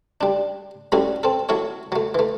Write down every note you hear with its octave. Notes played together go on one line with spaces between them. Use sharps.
G3 D4
G3 A3 C#4 E4 F#4 G#4
C4 A4
F#3 E4 A4 C#5
F#3 A3
E3 A3